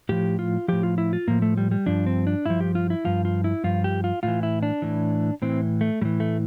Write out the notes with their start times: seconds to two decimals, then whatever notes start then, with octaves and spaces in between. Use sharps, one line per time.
0.09 A2 F3 G4
0.39 F4
0.68 A2 F3 G4
0.83 F4
0.98 E4
1.13 F4
1.28 A2 F3 A#3
1.42 A3
1.57 G3
1.71 G3
1.86 G2 F3 D4
2.06 C4
2.27 D4
2.46 G2 F3 E4
2.61 G4
2.75 F4
2.90 E4
3.05 G2 F3 F4
3.25 F4
3.44 E4
3.64 G2 F3 F4
3.84 G4
4.04 F4
4.23 A2 E3 F4
4.43 E4
4.63 D4
4.82 A2 E3
5.42 A2 E3 C4
5.81 A3
6.01 A2 G3
6.05 E3
6.20 A3